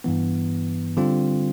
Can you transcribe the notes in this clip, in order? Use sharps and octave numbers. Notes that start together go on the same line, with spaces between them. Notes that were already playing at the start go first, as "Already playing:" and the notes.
G2 E3 B3
D3 G3 C4 F4